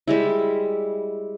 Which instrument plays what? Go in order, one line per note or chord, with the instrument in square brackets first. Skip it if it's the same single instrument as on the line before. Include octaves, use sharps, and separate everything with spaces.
[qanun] G3 G#3 E4